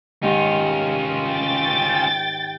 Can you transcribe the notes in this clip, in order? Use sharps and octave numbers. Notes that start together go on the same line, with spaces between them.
G#2 D#3 C#4 F4 G4
G5 A6